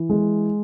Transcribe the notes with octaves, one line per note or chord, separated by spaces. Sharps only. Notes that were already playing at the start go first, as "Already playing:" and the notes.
Already playing: E3
G#3